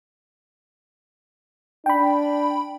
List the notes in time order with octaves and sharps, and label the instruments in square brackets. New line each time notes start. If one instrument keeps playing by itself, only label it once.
[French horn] D4 [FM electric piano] G5 B5